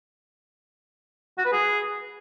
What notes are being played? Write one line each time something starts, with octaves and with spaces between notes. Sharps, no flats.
F#4
B4
G#4